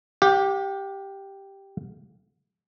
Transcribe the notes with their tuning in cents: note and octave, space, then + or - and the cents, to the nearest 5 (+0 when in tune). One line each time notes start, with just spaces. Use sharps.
G4 +0 F#5 -45